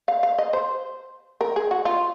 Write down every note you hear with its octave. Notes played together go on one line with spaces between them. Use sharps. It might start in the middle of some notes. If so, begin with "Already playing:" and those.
F5
F5
D#5
C5
A#4
G#4
F#4
F4